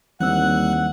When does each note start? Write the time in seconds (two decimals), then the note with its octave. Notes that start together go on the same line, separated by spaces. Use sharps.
0.20 D#2 E3 G3 C4 F#5 E6 F#6